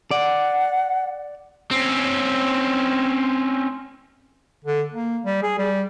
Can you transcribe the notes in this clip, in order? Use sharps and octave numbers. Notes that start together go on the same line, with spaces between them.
D5 F#5
C4 C#4
D3
A#3
G3
G#4
G3